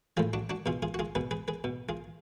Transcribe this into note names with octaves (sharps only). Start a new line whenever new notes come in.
A2 F3 F4 G#4
D4 F#4
D4 F#4
B2 F4 G#4
F4 G#4
F#4
F4 G#4
B2 G#4 B4
G#4 B4
G#4 B4
B2
F4 G#4